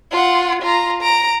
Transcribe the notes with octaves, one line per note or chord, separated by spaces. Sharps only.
F4 F#5
F4 A#5
A#5 D7